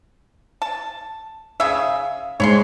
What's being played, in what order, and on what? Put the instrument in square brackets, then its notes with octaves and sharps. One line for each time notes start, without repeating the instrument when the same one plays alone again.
[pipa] A5
[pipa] C#3 E5 [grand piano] F5 D#6
[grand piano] G#2 G#3 C#7 [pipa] C#5 B5 C6